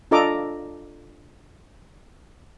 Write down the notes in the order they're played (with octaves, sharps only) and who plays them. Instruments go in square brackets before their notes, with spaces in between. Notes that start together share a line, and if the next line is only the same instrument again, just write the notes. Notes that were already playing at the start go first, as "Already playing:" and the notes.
[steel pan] D4 F4 A4 D#5 A#5 D6